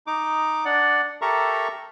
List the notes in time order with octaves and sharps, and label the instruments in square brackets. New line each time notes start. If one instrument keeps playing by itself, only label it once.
[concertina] D#4 D6
D4 D5 F#5
G4 A4 A#4 E5 A#5 C#6